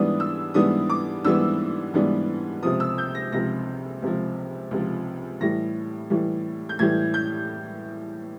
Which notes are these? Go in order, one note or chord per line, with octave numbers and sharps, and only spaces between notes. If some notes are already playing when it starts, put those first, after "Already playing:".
Already playing: G#2 E3 G3 B3 D4 D#6
E6
G#2 E3 G3 B3 D4 D#6
D6
G#2 E3 G3 B3 D4 E6
G#2 E3 G3 B3 D4
C#2 C3 F3 D#6
E6
G6
A#6
C#2 C3 F3 A#6
C#2 C3 F3
C#2 C3 F3
A2 E3 G3 A#6
A2 E3 G3
G6
A2 E3 G3 G#6
G6